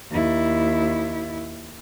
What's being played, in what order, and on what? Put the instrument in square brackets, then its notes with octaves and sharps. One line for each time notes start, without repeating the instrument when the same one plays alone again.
[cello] D#2 E4